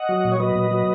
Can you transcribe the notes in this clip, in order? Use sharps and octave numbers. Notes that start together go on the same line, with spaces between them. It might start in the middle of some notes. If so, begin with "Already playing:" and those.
Already playing: D#5 F#5
F#3
A#2
C#5
F#3 B4 D#5
A#2
F#3